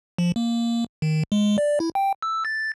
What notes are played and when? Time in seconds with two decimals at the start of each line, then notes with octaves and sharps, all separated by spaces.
0.18 F3
0.36 A#3
1.02 D#3
1.32 G#3
1.58 D5
1.80 E4
1.95 G5
2.22 E6
2.45 A6